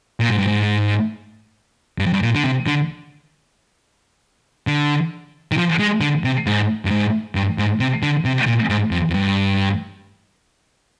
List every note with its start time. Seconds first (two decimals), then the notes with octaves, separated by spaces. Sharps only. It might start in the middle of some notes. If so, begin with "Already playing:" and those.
0.20 A#2
0.30 G#2
0.38 G2
0.47 G#2
1.99 G2
2.06 F2
2.13 G2
2.22 A#2
2.35 D3
2.44 C3
2.67 D3
4.67 D3
5.52 D#3
5.57 F3
5.79 G#3
6.01 D3
6.24 C3
6.47 G#2
6.85 G2
6.90 G#2
7.35 G2
7.58 G#2
7.80 C3
8.03 D3
8.25 C3
8.47 A#2
8.70 G#2
8.91 F2
9.10 F2
9.14 G2